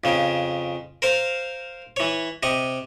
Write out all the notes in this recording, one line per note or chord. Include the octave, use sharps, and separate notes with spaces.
F2 C#3
A#4 C5 F5
E3 C#5
C3 D#5 C#6